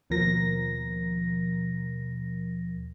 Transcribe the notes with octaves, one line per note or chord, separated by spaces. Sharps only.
D#2 B2 F3 A#4 A#6